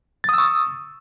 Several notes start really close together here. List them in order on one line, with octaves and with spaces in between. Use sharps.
A6 D#6 E6 C#6